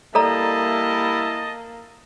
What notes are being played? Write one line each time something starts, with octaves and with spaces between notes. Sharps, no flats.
G3 A#3 E4 A4 D5 D#5 A5 A#5